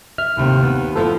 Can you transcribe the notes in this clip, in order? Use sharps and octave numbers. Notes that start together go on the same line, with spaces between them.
E5 F6
D#2 A2 C3 A3
B3
F3 A3 B3 E4 A4